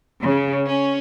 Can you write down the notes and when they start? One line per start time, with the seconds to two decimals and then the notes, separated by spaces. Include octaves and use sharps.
0.22 C#3
0.66 C#4